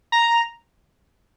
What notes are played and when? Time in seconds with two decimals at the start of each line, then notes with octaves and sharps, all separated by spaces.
0.12 A#5